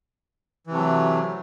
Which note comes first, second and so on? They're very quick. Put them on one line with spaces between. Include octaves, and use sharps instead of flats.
E3 C3 A3 F#3